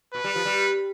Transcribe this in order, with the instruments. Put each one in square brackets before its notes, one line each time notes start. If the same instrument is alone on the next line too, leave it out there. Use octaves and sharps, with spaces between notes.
[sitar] B2 [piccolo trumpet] B4
[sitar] G3
F3
G3